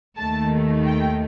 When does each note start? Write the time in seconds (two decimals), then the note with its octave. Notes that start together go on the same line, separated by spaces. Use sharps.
0.18 D#2 D#3 A3 A5
0.85 G5